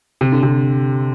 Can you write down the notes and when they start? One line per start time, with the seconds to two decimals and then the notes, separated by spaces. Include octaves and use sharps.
0.21 C3
0.32 D3
0.43 C3